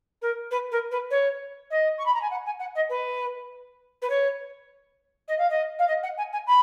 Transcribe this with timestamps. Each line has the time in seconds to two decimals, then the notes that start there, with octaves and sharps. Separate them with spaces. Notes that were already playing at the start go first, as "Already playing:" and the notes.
0.21 A#4
0.51 B4
0.71 A#4
0.91 B4
1.10 C#5
1.70 D#5
1.98 C#6
2.05 B5
2.14 A#5
2.21 G#5
2.30 F#5
2.45 G#5
2.59 F#5
2.75 D#5
2.89 B4
4.02 B4
4.09 C#5
5.28 D#5
5.38 F5
5.50 D#5
5.78 F5
5.87 D#5
6.03 F#5
6.17 G#5
6.32 G#5
6.47 B5